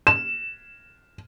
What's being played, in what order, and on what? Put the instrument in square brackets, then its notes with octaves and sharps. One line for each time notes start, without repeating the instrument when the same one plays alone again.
[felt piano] E7